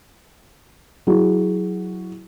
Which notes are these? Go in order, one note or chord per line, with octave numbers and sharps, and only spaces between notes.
F#3 E4 F#4 G#4